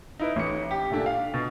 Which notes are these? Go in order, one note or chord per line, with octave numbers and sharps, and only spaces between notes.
D#4 E4 B4
A1 C#7
G4
A#2 A3 D4
F5
B2